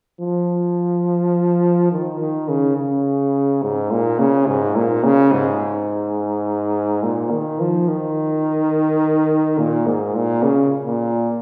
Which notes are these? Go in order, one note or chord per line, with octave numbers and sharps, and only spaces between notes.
F3
D#3
D#3
C#3
C#3
G#2
A#2
C#3
G#2
A#2
C#3
G#2
A#2
D#3
F3
D#3
A#2
G#2
A#2
C#3
A#2